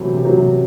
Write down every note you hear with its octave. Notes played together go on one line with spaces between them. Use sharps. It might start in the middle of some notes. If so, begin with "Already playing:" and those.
Already playing: C3 E3 F#3 A3 C4
C3
F#3
C3